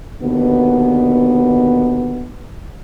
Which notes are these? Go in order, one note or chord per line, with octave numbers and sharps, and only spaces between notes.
D#2 B2 D3 B3